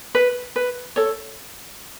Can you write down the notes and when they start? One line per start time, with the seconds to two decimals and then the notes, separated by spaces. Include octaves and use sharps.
0.15 B4
0.56 B4
0.96 A4 C#5